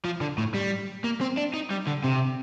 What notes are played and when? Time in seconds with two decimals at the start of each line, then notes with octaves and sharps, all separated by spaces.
0.05 F3
0.21 D3
0.38 A2
0.55 G3
1.04 A#3
1.21 C4
1.37 D4
1.54 D#4
1.71 G3
1.87 D3
2.04 C3